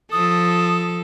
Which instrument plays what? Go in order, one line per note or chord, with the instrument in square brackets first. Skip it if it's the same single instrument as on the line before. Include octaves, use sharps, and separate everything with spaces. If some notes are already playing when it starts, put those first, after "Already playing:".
[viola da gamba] F3 A4 [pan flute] D#6